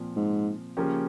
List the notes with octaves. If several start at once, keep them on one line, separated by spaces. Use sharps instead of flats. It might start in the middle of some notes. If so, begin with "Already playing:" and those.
Already playing: A#2 F3 C4 F4
G#2
C#3 F3 A#3 C#4 G4